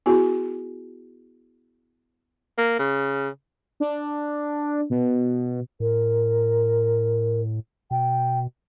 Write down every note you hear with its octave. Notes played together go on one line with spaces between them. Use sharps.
B3 E4 F#4 G#4
A#3
C#3
D4
B2
A2 A#4
B2 G5